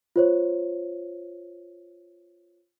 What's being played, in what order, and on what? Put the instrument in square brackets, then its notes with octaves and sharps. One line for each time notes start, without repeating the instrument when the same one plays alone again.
[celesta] F4 C5 C#5